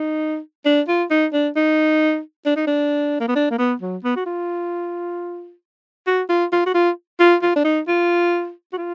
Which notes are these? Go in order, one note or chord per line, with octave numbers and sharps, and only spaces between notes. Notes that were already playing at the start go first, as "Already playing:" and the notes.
Already playing: D#4
D4
F4
D#4
D4
D#4
D4
D#4
D4
A#3
B3
D4
A#3
B3
F#3
B3
F#4
F4
F#4
F4
F4
F#4
F4
F4
F4
D4
D#4
F4
F#4
F4